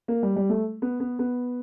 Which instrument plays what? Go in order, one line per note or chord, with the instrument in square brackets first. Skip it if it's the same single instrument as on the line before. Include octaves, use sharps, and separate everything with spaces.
[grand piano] A#3
G3
G3
A3
B3
B3
B3